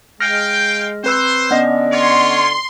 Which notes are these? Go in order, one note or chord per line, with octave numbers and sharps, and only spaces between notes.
G#3 F5 G5 F6 A#6
C4 B4 C5 E6
D3 B3 C#4 D5 D#5
F4 C#5 C6